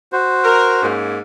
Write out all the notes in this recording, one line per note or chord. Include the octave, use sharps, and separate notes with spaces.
F#4 C5
A#4
G#2 A#3 C#4